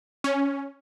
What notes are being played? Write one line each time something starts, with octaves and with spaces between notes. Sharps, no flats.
C#4